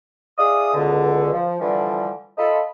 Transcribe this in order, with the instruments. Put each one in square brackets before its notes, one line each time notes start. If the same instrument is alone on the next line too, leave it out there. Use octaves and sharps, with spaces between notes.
[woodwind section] E4 G#4 D5 F5 D#6
C#2 B2 D3
F3
D3 E3 F3 G3
F4 A4 D#5 B5